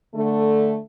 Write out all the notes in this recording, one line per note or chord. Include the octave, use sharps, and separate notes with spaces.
D3 A3